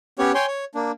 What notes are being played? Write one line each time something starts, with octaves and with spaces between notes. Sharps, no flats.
B3 C#4 G4 C#5
C#5 G5 G#5 C6
C#5
A#3 D4